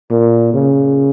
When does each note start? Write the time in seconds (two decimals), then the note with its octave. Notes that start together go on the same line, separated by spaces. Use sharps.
0.11 A#2
0.54 C#3